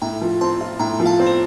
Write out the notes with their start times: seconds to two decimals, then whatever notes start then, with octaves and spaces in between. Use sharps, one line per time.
0.02 A2 G5 A#5
0.21 F3
0.41 C4 A5 C6
0.61 F4
0.79 A2 G5 A#5
1.00 F3
1.06 F5 A5
1.20 C4
1.26 C5